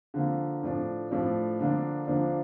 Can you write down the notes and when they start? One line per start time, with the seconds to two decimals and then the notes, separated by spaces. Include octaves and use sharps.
0.14 D3 F3 A#3
0.63 A2 F3 A3 D4
1.11 A2 F3 A3 D4
1.60 D3 F3 A#3 D4
2.08 D3 F3 A#3 D4